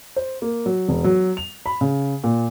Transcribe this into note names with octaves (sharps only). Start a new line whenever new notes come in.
C5
A#3
F#3
E1
F#3
F7
B5
C#3
A#2